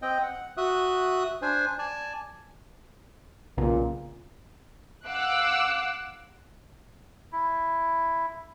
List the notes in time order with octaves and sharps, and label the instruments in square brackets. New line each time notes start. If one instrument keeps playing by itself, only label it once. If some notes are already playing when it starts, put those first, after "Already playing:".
[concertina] C4 D#5 G5
F#5
F#4 E5 D#6 F#6
D4 C5 G#5
D5 G#5 A5
[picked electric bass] B1 C#3 [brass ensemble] A#2
[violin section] F5 F#5 D6 E6 F#6
[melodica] E4